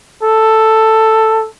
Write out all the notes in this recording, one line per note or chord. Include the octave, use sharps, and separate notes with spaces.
A4